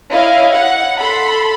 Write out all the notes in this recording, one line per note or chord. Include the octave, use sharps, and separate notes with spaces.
E4 C#5 D#5 F5
F#5
A4 B5 C6